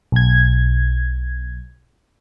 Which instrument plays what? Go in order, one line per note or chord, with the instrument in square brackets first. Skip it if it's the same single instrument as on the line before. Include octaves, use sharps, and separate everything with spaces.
[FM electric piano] B1 G#6